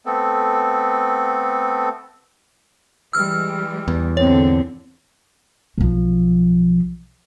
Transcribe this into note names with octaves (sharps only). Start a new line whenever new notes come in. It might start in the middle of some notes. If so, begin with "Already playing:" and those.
A3 B3 C4 A4
E3 G3 G#3 E6 F6
E2
G#2 D3 C4 C#5
B1 F3